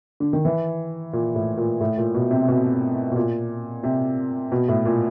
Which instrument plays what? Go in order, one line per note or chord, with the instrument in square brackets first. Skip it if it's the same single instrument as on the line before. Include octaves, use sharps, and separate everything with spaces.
[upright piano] D3
D#3
E3
A#2
A2
A#2
A2
A#2
B2
C3
B2
B2
A#2
C3
B2
A2
A#2